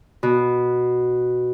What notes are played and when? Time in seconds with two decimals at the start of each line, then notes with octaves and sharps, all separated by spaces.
0.23 B2